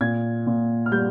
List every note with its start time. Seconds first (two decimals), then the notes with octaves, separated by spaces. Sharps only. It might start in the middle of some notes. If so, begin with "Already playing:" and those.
0.01 A#2 G#6
0.47 A#2
0.86 F6
0.92 G3 G6